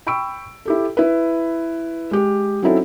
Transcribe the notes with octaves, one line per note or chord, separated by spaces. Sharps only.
G5 B5 C#6 E6 D7
E4 G4 A4
E4 B4
G#3 G4
F#3 C4 C#4 D#4 E4 A4